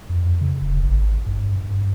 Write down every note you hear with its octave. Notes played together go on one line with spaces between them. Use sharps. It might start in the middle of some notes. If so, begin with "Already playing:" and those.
F2
C#3
E1
G#1
G2
G2